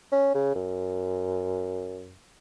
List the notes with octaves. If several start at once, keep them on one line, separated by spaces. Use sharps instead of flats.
C#4
C#3
F#2